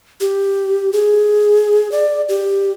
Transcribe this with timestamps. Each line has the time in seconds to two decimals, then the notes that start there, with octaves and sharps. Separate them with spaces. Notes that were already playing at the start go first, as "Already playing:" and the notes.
0.21 G4
0.93 G#4
1.92 D5
2.29 G4